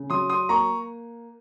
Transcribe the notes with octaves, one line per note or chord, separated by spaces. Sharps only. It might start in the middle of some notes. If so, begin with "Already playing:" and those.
Already playing: C#3
F#3 C6 D#6
C6 D#6
A#3 A#5 C#6